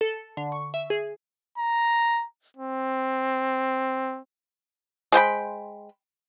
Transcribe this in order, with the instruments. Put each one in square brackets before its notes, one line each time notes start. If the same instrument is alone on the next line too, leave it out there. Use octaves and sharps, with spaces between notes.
[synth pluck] A4
D3
C#6
E5
G#4
[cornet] A#5
C4
[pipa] G#3 C5 G5 B5